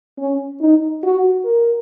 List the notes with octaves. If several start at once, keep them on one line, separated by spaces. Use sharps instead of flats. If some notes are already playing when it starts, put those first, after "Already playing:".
C#4
D#4
F#4
A#4